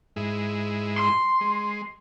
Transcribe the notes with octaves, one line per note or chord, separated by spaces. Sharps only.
G#2 G#3 E4
C6
G#3